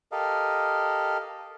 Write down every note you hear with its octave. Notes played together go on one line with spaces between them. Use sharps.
G4 A4 A#4 D#5 F5